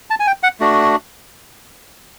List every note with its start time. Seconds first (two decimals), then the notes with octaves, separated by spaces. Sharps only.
0.10 A5
0.20 G#5
0.27 G5
0.43 F#5
0.60 A3 D4 F#4